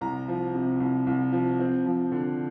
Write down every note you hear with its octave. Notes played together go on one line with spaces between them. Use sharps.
C2 A#5
F3
C3
C2
C2
F3
C4
F3
D3